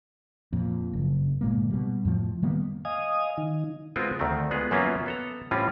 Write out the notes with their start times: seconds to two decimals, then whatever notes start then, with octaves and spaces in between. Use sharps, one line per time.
0.53 F2 A#2
0.93 F#1
1.41 G1 A#2 G#3 A#3
1.70 B2 G3
2.05 F2 A2 F3
2.43 D#3 G3 A#3 B3
2.85 D#5 F5 G#5 D#6
3.37 D#3 D#4
3.96 G#3 B3 C4 F4 F#4 A#4
4.19 D2 D#3 A3 C4
4.51 G#3 B3 F4 G#4
4.71 F#2 F#3 A#3 B3 C#4 F4
5.06 B3 A4 A#5
5.51 A2 E3 G3 C4 C#4 F4